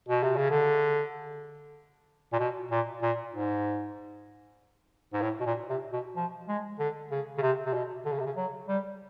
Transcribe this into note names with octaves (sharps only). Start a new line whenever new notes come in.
B2
C3
C#3
D3
A#2
B2
A#2
A#2
G#2
G#2
A2
B2
A#2
C3
B2
F3
G#3
D3
C#3
C#3
C3
C3
B2
D3
C#3
C3
C#3
F#3
G3